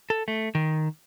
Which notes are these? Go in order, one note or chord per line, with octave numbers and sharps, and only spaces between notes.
A4
A3
D#3